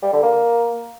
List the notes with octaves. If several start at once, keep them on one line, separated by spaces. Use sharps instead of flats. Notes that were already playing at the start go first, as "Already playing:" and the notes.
G3
D3
A#3